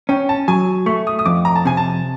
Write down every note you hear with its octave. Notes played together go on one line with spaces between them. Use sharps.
C#4 G5
A5
F#3 G#5
A3 C#6
D#6
D#6
F2 D6
A#5
A5
C3 G#5
A5